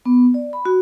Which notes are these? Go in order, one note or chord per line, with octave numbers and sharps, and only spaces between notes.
B3
D5
B5
F#4